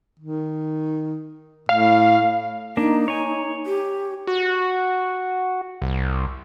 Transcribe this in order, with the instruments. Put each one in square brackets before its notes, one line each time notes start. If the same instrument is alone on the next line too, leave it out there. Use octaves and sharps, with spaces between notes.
[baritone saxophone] D#3
[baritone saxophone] A2 [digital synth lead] F5
[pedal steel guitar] A#3 D4 [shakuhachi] D#4
[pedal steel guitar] C#5 G#5
[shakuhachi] G4
[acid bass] F#4
C2